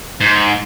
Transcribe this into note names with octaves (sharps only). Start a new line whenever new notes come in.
G#2